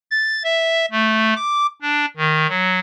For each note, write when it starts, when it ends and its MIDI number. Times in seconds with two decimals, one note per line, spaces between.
0.11 0.43 93
0.44 0.85 76
0.91 1.34 57
1.36 1.67 86
1.82 2.06 62
2.17 2.47 51
2.49 2.80 54